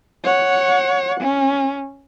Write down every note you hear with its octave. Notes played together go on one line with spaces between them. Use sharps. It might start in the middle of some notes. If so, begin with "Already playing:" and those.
C#5 F#5
C#4